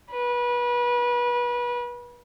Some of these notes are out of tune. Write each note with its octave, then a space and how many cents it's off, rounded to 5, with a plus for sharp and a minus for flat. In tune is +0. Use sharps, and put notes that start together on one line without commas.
B4 -30